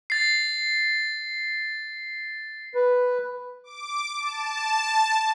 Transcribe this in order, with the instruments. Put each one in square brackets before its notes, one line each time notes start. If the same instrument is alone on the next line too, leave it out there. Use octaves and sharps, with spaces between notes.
[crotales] A6 C7
[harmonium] B4
[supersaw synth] D6
A5